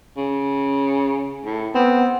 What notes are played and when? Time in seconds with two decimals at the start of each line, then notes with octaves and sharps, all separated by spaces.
0.17 C#3
1.45 A2
1.75 B3 C4